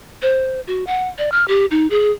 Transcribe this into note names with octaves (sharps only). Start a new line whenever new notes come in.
C5
F#4
F#5
D5
F6
G4
D#4
G#4